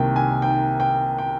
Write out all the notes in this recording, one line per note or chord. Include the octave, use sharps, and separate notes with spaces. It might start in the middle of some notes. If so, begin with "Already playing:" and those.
Already playing: C2 C3 D#3 A#3 G5
G#5
G5
G5
G5